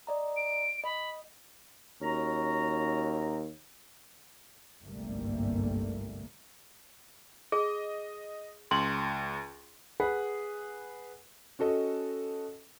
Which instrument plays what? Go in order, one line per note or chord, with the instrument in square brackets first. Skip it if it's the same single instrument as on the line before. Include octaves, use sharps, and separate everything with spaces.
[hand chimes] D5 D#5 A#5
[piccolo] D7
[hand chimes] D#5 [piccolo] B5
[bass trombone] D#2 [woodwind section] C#4 F#4 A#5
[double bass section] G1 C2 G#2 G3 A3 A#3
[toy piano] G#4 [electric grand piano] D#5
[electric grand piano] C#2 [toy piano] C6
[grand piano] G#4 B4 F#5 B5
C#4 F#4 A4 D#5